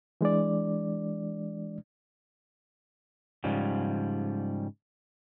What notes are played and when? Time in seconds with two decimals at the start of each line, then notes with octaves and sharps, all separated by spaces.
0.21 E3 G#3 D4 D5
3.44 G#2 C#3 F3 G3